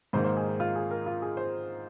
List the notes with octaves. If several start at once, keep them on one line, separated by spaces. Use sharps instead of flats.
G#2 D#3 A#3 C5
C5
G#4
D#4
F4
G#4
A#4
F4
G#4
C5